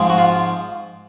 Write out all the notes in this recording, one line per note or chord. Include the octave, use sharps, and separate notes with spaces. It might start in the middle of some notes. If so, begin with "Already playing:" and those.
Already playing: G#2 F3 G#3 C4
F#4
F4